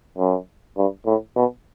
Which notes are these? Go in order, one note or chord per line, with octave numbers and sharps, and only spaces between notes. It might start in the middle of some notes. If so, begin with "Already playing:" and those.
F#2
G2
A2
B2